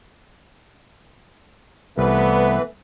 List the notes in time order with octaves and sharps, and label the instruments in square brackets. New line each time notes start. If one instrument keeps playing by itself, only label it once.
[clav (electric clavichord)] C2 [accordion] E3 B4 [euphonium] A3 [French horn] B3